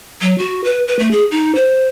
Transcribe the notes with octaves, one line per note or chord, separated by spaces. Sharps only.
F#3
F#4
B4
B4
A3
G#4
D#4
C5